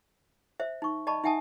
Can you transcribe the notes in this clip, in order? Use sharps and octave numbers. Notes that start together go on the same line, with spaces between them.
C5 E5
D#4 C#6
D5 D#5 A5 B5 C#6
D#4 E5 F#5 G#5 A5 D#6